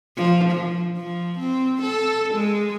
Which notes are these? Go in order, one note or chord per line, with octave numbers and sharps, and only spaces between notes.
F3
F3
F3
C4
A4
G#3